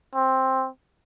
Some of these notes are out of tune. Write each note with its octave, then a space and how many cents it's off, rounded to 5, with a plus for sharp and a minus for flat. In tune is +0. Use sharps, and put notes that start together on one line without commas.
C4 +10